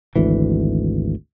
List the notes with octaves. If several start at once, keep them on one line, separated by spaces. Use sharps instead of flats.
G#1 D2 E3